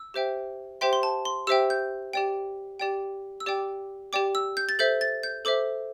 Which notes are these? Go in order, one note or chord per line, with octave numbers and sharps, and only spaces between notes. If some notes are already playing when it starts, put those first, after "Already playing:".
Already playing: E6
G4 C5 E5 G5
G4 C5 E5 G5 C6
C6
A5
C6
G4 C5 E5 G5 E6
G6
G4 D5 G5
G4 D5 G5
E6
G4 D5 G5 D6
G4 D5 G5 D6
E6
G6
A6
A4 C5 E5 G6
A6
G6
A4 C5 E5 D6